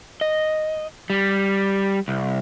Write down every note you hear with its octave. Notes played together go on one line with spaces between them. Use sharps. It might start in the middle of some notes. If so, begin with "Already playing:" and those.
D#5
G3
C2